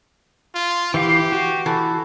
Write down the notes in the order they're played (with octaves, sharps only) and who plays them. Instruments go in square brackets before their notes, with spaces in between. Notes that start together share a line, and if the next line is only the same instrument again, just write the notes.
[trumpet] F4
[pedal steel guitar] E3 F5 [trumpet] G4
[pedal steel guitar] F#4
[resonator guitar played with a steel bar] E3 A4